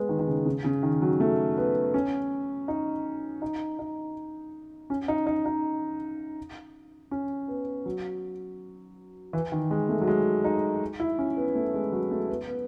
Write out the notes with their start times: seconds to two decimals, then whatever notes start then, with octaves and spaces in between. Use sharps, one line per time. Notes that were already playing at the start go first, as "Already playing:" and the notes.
Already playing: G#3 B3
0.09 D#3
0.19 D#3
0.28 C#3
0.46 C#3
0.64 C#3
0.83 D#3
1.02 F#3
1.20 A3
1.57 B3
1.94 C#4
2.68 D#4
3.42 D#4
3.79 D#4
4.90 C#4
5.08 D#4
5.27 D#4
5.46 D#4
7.11 C#4
7.48 B3
7.86 F#3
9.33 E3
9.52 D#3
9.71 G#3
9.89 A3
10.01 F#3
10.07 G#3
10.44 D#4
11.00 E4
11.19 C#4
11.37 B3
11.55 A3
11.74 G#3
11.92 F#3
12.11 A3
12.29 B3
12.48 B3